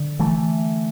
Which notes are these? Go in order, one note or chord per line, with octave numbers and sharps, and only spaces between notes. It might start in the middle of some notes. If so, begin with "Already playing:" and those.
Already playing: D3
E3 A3